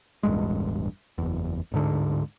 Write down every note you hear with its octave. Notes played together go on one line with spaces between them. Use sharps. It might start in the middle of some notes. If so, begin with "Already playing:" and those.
E1 A1 G2 G#3
F#1 E2
D1 G#2 D3